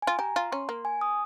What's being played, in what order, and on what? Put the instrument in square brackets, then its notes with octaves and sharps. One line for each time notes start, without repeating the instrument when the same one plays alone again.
[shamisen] F4 [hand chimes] G#5
[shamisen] G4 [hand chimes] A#5
[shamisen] F4 [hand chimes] C6
[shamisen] C#4 [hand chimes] C6
[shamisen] A#3
[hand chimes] G#5
D#6